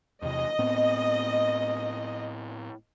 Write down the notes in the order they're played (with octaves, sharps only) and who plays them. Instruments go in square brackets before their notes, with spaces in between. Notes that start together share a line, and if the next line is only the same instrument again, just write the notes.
[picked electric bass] E2 C3 [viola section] D#5
[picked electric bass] A2 B3 C4